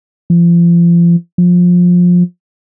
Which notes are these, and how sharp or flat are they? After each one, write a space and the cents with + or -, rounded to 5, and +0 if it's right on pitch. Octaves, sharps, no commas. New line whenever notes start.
F3 -35
F3 +20